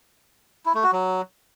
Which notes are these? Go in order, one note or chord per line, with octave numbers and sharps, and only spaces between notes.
E4
A3
F#4
F#3